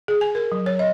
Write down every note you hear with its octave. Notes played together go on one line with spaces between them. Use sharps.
G#4
G#5
A#4
F#3
C#5
D#5